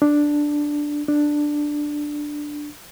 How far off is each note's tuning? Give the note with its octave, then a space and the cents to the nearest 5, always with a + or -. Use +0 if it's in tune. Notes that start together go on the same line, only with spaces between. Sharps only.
D4 +0
D4 +5